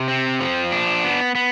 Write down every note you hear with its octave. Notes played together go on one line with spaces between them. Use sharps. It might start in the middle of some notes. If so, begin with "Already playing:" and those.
Already playing: C3
C4
F3
D4
B3
B3